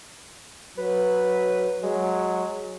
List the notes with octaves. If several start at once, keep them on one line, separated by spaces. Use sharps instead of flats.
F#3 B4
F#3 G#3